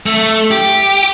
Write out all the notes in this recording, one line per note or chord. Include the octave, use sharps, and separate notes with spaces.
A3
G4